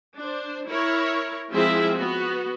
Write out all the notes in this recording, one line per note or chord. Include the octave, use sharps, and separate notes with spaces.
D4 C5
E4 A#4 C#5
F3 G#3 C4 E4 G#4 E5
B3 F#4